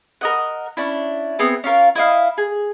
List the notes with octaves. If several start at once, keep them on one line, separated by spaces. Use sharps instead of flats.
A#4 D#5 F#5
C#4 D4 E4
B3 C4 G#4
C#4 F4 A#4 F5
E4 D#5 F5
G#4